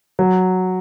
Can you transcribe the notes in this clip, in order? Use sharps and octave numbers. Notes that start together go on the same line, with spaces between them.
F#3